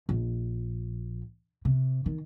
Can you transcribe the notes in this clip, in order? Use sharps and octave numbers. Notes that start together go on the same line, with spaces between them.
A#1
C3
D#3